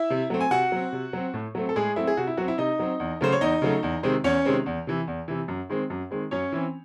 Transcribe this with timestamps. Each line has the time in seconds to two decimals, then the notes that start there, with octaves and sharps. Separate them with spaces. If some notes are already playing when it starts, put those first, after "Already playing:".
Already playing: E4 E5
0.10 C3
0.30 F#3 A3 C4
0.40 G#5
0.51 C3 F#4 F#5
0.72 F#3 C4
0.92 C3
1.13 F#3 C4
1.34 A2
1.55 F#3 A3 C4
1.69 A4
1.75 A2 G#3 G#4
1.96 F#3 A3 C4 E4
2.07 G#4
2.17 C3 F#4
2.27 E4
2.37 F#3 C4 F#4
2.48 E4
2.58 C3 D#4 D#5
2.79 F#3 C4
3.00 E2
3.21 C#3 F#3 A3 C5
3.32 C#5
3.41 E2 D#4 D#5
3.62 C#3 F#3 A3
3.83 E2
4.03 C3 D#3 G#3 C4
4.24 E2 C#4 C#5
4.45 C3 D#3 G#3 C4
4.66 E2
4.87 C3 E3
5.07 E2
5.28 C3 E3
5.48 F#2
5.69 D#3 G#3 C4
5.90 F#2
6.11 D#3 G#3 C4
6.31 F#2 C#4 C#5
6.52 E3 C4